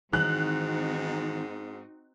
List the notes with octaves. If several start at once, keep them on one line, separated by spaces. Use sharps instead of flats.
G#2 D#3 E3 C4 D#4 F#4 F#6